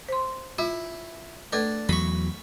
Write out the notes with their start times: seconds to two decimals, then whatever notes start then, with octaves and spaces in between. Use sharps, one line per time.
0.08 C5 C6
0.58 E4 F4
1.53 A3 D4 A4 B4
1.89 E2 F#3 B5 C#6